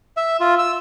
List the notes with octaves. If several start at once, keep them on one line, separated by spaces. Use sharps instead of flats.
E5
F4
E6